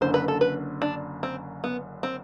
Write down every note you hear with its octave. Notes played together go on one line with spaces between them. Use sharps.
F#1 F#2 D3 C5
B4
A4
B4
D4
C4
B3
C4